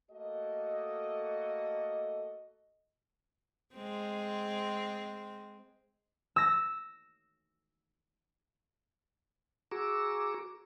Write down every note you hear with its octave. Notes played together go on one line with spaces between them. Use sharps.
A3 A#3 F#4 A4 D#5
G#3 C4
E6 A#6
F#4 G#4 A#5 C#6 D6 E6